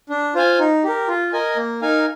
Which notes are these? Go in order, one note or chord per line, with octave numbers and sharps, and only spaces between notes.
D4
F4 C5 F5 G#5
D#4
G4 A#4
F4
A#4 D#5 G#5
A#3
D#4 A#4 F5 G#5